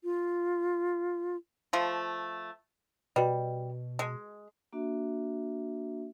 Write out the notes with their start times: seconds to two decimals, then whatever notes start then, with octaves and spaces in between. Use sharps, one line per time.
0.04 F4
1.73 F3 A3
3.16 B2 G3 F#4 B4 D#5
3.99 G#3
4.73 A#3 D4 F#4 E5